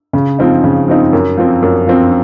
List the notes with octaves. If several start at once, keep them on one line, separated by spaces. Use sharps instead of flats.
C#3
F3 C4 D#4
C#3
F3 C4 D#4
F#2
F3 C4
F#2
F3 C4